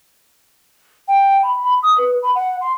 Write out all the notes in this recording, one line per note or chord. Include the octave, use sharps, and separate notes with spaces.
G5
B5
B5
D#6
B4
B5
F#5
C6